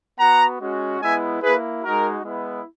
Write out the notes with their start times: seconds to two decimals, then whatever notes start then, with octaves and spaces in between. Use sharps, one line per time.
0.19 B3 F#4 F#5 A#5
0.61 G#3 C#4 F#4
1.01 G#3 B3 E4 E5 G#5
1.42 A#3 E4 G#4 B4
1.83 G#3 D#4 F#4 A#4
2.24 G#3 B3 E4